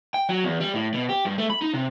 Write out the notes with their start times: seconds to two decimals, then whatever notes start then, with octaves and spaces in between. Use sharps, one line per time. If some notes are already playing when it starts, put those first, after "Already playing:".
0.14 G5
0.29 F#3
0.44 E2
0.60 G3
0.75 A2
0.94 B2
1.10 G4
1.26 G2
1.39 A3
1.50 B5
1.62 D#4
1.74 C3